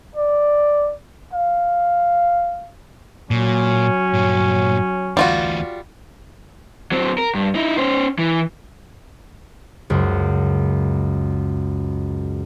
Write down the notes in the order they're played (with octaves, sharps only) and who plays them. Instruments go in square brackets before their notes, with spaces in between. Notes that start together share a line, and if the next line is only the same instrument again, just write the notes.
[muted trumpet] D5
F5
[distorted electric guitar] A#2 [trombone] F#3 [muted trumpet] C#4
[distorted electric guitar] G2 A#2
[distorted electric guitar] D2 E3 [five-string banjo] G3 F4 F#4
[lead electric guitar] F#3 C4
A#4
G2
D#4 E4
C#4 C5
E3
[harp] C#2 F#2